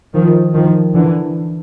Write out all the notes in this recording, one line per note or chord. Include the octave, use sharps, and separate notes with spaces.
D#3 F3
D#3 F3
D3 E3